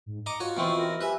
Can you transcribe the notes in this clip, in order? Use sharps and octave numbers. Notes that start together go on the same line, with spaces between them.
G#2
D#5 A#5 D6 C#7
F4 F#4 C#5
B2 E3 C4 G5 C6 C#6
A#4
G4 B4 E5 G#5